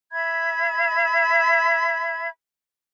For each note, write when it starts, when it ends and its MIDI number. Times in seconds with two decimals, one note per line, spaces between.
0.12 2.28 76
0.12 2.28 83
0.12 2.28 92